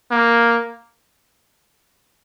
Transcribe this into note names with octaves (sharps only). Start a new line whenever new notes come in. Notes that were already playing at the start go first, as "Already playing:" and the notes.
A#3